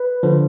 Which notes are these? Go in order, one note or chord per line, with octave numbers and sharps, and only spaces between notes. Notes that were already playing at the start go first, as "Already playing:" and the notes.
Already playing: B4
D3 F3